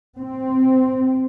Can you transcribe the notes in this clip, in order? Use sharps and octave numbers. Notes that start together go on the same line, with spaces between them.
C4